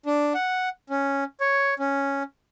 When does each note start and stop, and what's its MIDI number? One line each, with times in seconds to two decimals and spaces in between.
0.06 0.33 62
0.34 0.69 78
0.90 1.24 61
1.41 1.74 73
1.79 2.23 61